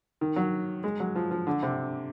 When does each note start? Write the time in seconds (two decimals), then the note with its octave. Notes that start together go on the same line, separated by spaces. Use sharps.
0.21 D#3
0.36 F#3
0.84 G#3
1.00 F#3
1.15 F3
1.31 F3
1.47 D3
1.63 C3